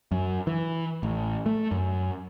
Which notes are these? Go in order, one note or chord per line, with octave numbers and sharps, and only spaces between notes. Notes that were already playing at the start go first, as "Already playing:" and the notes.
F#2
E3
A1
A3
F#2